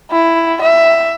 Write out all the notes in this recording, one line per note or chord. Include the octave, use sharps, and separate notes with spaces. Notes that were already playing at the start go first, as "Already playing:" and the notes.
E4
E5